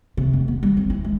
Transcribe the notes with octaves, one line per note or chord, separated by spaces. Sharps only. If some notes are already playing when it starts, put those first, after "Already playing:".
C3
F1
B3
G3
C4
E4
G#3